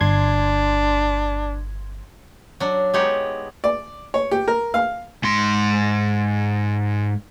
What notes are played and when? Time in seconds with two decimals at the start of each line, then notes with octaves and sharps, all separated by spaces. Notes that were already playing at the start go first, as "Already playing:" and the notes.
0.01 G1 D4 C6 G#6
2.60 F#3 D4
2.93 G#3 B3 D#4 G4 C#5
3.64 D5
4.14 C#5
4.31 G4
4.48 A#4
4.74 F5
5.24 G#2 C6